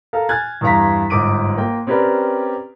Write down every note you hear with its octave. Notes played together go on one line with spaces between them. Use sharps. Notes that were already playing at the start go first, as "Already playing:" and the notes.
A4 A#4 F5
G#5 F6 F#6 G#6 A6
E2 G2 G3 F5 A#5 B6
G1 G#2 D6 D7 D#7
A#3 F4 G5
C4 C#4 G4 A#4 B4 D5